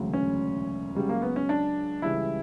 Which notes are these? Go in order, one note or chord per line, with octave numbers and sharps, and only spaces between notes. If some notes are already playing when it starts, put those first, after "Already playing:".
Already playing: E1 D2 C#3 F#3
C#4
C#2 C#3 F#3 G3
A#3
B3
C#4
D4
C#2 C#3 E3 G3 E4